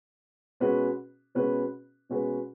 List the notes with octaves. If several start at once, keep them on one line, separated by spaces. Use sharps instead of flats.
B2 G#3 C#4 F#4 B4
B2 G#3 C#4 F#4 B4
B2 G#3 C#4 F#4 B4